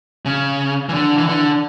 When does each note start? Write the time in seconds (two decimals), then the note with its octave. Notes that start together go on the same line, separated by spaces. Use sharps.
0.25 C#3
0.89 E3
0.94 D3
1.17 E3
1.27 D3